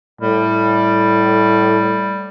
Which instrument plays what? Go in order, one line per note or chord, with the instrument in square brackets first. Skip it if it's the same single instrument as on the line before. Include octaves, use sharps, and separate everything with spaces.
[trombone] A2 [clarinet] G3